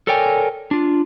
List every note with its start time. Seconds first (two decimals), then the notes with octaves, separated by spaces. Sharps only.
0.07 A4 A#4 C#5 D5 G5 G#5
0.71 D4 F4